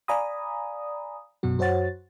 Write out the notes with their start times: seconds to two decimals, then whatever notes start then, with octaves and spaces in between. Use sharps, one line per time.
0.08 D5 F5 G#5 A#5 B5 D#6
1.43 F#2 B2 F#3 F#4
1.58 F#2 F#4 C5 C#5 F#5 A6